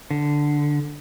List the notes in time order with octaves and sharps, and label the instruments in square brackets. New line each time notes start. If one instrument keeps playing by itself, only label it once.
[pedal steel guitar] D3